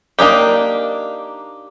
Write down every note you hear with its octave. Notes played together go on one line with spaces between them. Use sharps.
A#3 D4 D#4 G4